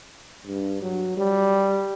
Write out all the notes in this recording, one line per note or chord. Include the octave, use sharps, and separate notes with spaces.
G2
F#3
G3